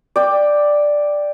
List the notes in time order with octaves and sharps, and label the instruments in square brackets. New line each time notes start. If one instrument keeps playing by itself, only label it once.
[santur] D5 G5